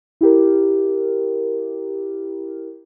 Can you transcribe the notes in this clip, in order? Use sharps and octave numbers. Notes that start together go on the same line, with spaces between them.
E4 G4 A#4